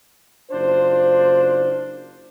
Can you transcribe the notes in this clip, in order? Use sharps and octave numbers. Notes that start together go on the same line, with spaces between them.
F#1 D4 F4 C5